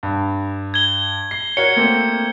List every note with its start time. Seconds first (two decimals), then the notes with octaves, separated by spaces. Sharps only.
0.03 G2
0.74 G#6 G7
1.31 C7
1.57 F#4 A#4 C#5 C#7
1.76 A3 A#3 C4